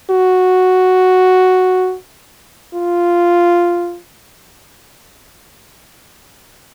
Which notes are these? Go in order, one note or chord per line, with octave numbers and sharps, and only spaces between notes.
F#4
F4